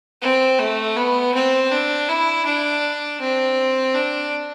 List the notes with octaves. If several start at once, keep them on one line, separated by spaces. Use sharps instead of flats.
C4
A3
B3
C4
D4
E4
D4
C4
D4